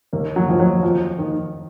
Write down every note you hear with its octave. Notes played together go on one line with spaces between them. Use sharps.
D#2 A#3
F#3
D#2 F3
F#3
F2 F3
D#3